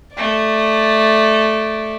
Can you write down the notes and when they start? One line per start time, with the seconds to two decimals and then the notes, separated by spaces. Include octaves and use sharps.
0.14 A3 D5